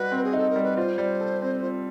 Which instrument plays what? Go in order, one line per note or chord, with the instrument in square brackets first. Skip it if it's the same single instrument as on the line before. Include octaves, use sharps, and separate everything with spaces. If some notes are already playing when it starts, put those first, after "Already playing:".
Already playing: [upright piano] G3 D#4 F#4 [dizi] B4
[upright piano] C4
[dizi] G#4
[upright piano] D#4 [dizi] A4
[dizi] A#4
[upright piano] G3
[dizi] B4
[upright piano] F4 [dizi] C5
[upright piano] G3
A4
C4
F4